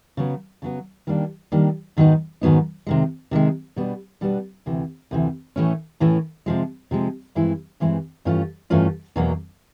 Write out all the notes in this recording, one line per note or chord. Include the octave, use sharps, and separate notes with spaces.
C#3 F#3 B3
C#3 F#3 B3
D#3 G3 A#3 D4
D#3 G3 A#3 D4
G#2 D#3 F#3 B3 D#4
G#2 D#3 F#3 B3 D#4
C3 D#3 G#3
C3 D#3 G#3
B2 G3 B3 D4
B2 G3 B3 D4
D2 C3 E3
D2 C3 E3
A2 E3 A3 C#4
A2 E3 A3 C#4
C3 F3 G#3
C3 F3 G#3
G2 E3 G#3 C4 E4
G2 E3 G#3 C4 E4
G2 E3 A3 C#4 F4
G2 E3 A3 C#4 F4
E2 B2 F#3 A#3